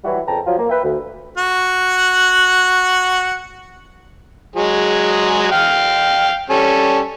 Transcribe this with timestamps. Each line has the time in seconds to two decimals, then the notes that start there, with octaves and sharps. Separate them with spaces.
0.04 E3 F#3 G3 E4 F#4
0.26 F2 C#3 B4 G5 A5 A#5
0.46 F3 F#3 F4
0.58 A#3
0.69 B4 E5 G5
0.84 D2
1.38 F#4 F#5
4.56 F#3 G#3 G#4
5.52 F5 G5 F6
6.50 G3 C#4 A4